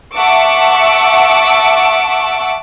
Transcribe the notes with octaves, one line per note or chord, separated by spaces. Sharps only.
E5 F#5 A5 C#6 D6 E6